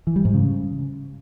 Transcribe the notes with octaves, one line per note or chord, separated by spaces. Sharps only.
E3
G3
G#2
C#3